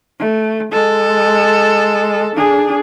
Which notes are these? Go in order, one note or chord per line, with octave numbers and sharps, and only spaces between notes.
A3
G#3 A4
D4 G#4